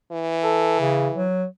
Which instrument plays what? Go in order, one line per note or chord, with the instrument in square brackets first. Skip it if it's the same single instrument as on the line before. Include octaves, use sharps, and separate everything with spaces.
[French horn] E3
[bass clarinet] A4
C#3
F#3